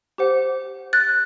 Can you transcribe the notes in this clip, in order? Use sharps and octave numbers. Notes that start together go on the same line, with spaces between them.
G4 C5 F#5
F#6 A6